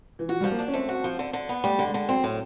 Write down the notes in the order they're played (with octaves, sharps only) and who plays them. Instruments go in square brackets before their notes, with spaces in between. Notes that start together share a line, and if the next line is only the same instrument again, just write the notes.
[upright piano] E3
[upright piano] F3 [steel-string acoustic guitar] F#4
[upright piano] G3
[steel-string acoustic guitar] F3
[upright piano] A#3
[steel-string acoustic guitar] D4
[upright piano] C#4
[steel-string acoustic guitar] A3 [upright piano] C4
[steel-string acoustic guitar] F#4
F3
D3
D3
B3
[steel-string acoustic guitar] G3 [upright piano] A3
[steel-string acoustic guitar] D3
[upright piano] G#3
[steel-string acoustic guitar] D3
[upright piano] F#3 [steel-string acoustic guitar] C4
[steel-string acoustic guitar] A2